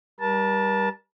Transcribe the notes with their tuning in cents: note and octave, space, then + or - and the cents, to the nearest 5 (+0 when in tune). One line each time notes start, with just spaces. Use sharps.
G3 +0 A#4 +40 A5 +0